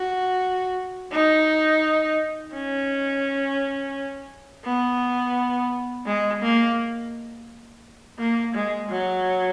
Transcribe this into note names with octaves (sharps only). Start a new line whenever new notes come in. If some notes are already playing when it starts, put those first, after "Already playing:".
Already playing: F#4
D#4
C#4
B3
G#3
A#3
A#3
G#3
F#3